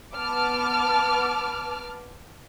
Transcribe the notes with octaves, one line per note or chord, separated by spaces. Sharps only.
B3 A5 D6 F6